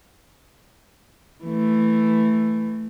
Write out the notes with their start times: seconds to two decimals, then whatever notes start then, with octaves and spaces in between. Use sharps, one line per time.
1.45 E3 A3